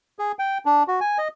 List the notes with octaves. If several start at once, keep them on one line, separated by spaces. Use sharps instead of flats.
G#4
G5
D4
F#4
G#5
D#5